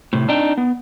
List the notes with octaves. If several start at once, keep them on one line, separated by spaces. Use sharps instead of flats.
A2 C3
C4 D4 D#4 G5
B3